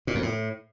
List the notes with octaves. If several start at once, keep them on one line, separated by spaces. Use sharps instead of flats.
A#2
F2
A2